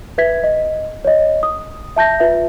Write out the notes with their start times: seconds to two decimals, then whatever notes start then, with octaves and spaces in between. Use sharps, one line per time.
0.18 B4 E5 G#6 B6
0.44 D#5
1.05 C#5 D#5
1.43 D#6
1.96 E5 A5 G6 A#6
2.20 F4 B4 E5